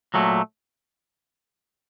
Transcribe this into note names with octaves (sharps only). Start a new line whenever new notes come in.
A#2 F#3 A3